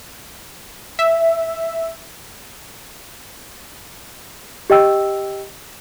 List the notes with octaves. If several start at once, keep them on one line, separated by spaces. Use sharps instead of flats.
E5
G4 D#5 G5 E6